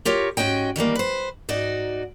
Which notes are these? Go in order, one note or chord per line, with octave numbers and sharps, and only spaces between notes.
F4 G4 A#4 C#5
G#2 C#4 F#4 D#5 G5
D#3 E3 G3 A#3
B4 C5
G#2 D#4 F#4 D5